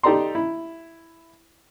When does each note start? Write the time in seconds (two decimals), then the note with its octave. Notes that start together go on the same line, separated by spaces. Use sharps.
0.03 D#4 G4 A4 D5 A#5 C6
0.35 E4